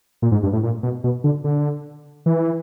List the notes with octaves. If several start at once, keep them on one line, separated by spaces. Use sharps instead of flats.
A#2
G#2
G2
A2
A#2
B2
B2
D3
D3
E3